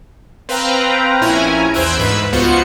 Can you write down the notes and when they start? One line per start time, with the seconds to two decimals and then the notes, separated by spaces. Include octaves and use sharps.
0.49 C4 B4 F5 G5 A#5
1.21 A#1 C#4 E4 G#5 A#5
1.74 E2 C5 E6 F#6 G#6 D7
1.97 D2 G#2 B4 B5 E6
2.32 C#2 B3 F4 F#4 C5 C#7